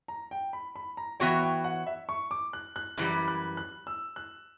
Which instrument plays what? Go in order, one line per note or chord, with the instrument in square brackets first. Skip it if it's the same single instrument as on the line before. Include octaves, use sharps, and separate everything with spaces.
[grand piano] A#5
G5
B5
B5
A#5
[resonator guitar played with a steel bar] E3 B3 F#4 C#5 [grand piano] G5
[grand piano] G5
F#5
E5
C#6
D6
F#6
F#6
[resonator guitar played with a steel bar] F#2 E3 G3 [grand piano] F#6
[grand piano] F#6
F#6
E6
F#6